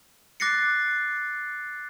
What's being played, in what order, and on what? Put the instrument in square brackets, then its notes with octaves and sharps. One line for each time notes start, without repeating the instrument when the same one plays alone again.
[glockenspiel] D6 F#6 A6 A#6 C7 C#7